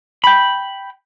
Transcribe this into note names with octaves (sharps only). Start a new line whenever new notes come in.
G5 B5